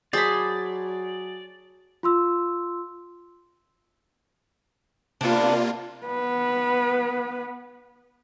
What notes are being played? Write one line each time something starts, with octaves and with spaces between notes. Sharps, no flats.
F#3 G#4 C5 D5 A5 B5
F4 C6 E6
C3 A#3 B3 D4 F4
B3 B4